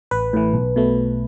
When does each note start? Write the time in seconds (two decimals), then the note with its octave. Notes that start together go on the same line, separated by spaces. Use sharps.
0.11 A1 B4
0.33 A2 E3
0.54 B1
0.76 B2 A3